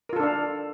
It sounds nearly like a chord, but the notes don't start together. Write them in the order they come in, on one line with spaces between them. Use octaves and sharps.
A#4 F4 A4 D4 F5